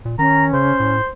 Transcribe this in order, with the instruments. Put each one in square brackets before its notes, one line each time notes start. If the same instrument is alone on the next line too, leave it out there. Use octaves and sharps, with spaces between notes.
[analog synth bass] A#2
[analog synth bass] D#3 [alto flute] C#4 [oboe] A#5
[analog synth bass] C#3 [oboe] C5
[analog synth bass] A2